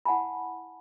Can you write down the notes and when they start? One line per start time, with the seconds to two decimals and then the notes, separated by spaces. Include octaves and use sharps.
0.05 E4 F#5 G#5 A5 B5